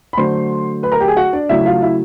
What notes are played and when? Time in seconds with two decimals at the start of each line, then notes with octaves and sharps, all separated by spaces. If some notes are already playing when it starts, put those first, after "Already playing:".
0.13 B5
0.17 D3 F#3 A3 C5 C6
0.83 B4 B5
0.92 A#4 A#5
1.00 G4 G5
1.08 G#4 G#5
1.16 F#4 F#5
1.33 D4 D5
1.49 C#3 F#3 A3 E4 E5
1.66 F4 F5
1.82 E4 E5